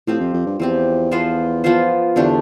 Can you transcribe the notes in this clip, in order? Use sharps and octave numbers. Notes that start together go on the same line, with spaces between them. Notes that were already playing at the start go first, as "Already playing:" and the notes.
A2 F3 C4 G4
F2
F2
G2
E2 F3 C4 G4
F3 B3 F4 C5
F3 B3 F4 C5
E2 D3 A3 D4 G4